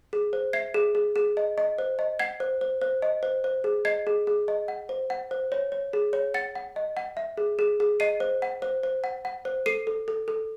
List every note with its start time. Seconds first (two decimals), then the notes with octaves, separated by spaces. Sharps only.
0.13 G#4
0.33 C5
0.53 E5 G#6 C7
0.74 G#4
0.95 G#4
1.16 G#4
1.37 D#5
1.58 D#5
1.79 C5
1.99 D#5
2.19 F#5 G#6 C7
2.40 C5
2.61 C5
2.81 C5
3.02 D#5
3.23 C5
3.44 C5
3.64 G#4
3.85 D#5 G#6 C7
4.07 G#4
4.27 G#4
4.48 D#5
4.68 F#5
4.89 C5
5.10 F#5
5.31 C5
5.52 C#5
5.72 C#5
5.93 G#4
6.13 C#5
6.34 F#5 A6 C#7
6.55 F#5
6.76 D#5
6.97 F#5
7.17 E5
7.37 G#4
7.59 G#4
7.80 G#4
8.00 D#5 C7 D#7
8.20 C5
8.42 F#5
8.62 C5
8.83 C5
9.04 F#5
9.25 F#5
9.45 C5
9.66 A4 C7 D#7
9.87 A4
10.08 A4
10.28 A4